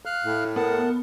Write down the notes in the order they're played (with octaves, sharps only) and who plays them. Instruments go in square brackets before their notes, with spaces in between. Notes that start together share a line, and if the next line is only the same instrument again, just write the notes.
[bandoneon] F5 F6 F#6
[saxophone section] A2
[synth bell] B3 [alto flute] A#4 [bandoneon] F#5 A5